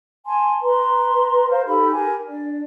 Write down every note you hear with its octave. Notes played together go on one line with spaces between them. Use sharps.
G#5 A5 C6
B4 A#5 C6
A#4 C5 F5
D#4 G4 A4 B5
G4 A#4 G#5
D4 D5